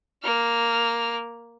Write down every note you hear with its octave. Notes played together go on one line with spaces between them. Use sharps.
A#3 F6